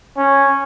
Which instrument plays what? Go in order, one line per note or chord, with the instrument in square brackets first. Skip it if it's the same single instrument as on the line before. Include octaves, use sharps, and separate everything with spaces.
[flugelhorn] C#4